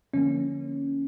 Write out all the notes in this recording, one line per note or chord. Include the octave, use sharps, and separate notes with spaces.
D3 F3 A#3 C#4